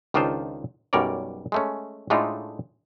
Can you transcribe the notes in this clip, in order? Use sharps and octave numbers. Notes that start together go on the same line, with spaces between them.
C#2 D#3 D4 D#4 F4 C5
B1 F#2 G3 A#4 C#5 D5
G#3 A3 C#4
A2 G#3 A3 D4 D#4 F4